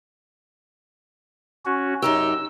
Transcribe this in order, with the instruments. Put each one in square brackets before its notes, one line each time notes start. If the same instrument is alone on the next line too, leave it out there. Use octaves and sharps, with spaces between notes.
[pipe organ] C#4 F#4
[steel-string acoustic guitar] F#2 D#4 G4 [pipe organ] E6